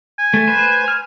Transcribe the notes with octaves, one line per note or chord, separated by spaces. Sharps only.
G#5
A3
B4 C5
F6